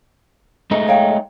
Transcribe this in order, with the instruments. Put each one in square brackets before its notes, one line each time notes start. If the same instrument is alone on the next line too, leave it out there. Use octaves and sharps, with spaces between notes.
[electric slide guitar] G#3 A3 D#4
[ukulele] C#5 F5 G5